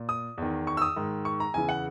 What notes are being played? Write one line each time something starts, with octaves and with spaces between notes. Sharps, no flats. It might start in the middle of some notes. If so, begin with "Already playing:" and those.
Already playing: A#2
D#6
E2 D#3
C#6
E6
D#6
G#2 D#3
C#6
A#5
E2 C#3 E3 G#5
F#5